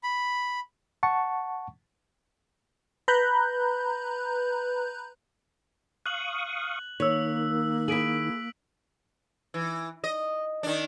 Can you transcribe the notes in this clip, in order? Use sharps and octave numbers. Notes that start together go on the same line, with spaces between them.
B5
F#5 A5 C#6
B4 A#5 B5 F#6 G6
F5 C#6 D#6 F#6 F#7
D#3 A#3 C#5 E6 B6
E4 G#4 B6 D7 F#7
E3
D#5
D#3 D4